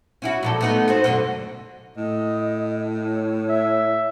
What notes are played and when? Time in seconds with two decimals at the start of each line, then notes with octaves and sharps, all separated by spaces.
0.22 C#4 E4 F#4
0.43 A#2 F3 A4
0.61 A3 B3 D#4
0.88 D#4 F#4 C5
1.04 F#2 B2 D3
1.97 A2 D#5
3.06 C#5
3.49 E5